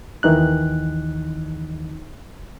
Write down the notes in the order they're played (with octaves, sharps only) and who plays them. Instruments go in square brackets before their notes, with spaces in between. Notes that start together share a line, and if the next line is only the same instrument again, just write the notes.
[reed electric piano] D#2 D#3 E3 D#4 F#6